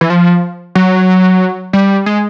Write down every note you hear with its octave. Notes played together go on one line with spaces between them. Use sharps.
E3
F3
F#3
G3
G#3